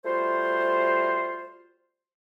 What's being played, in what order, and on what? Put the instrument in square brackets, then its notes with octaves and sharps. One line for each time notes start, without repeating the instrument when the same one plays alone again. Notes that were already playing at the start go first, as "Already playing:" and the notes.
[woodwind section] G3 A3 F4 F#4 C5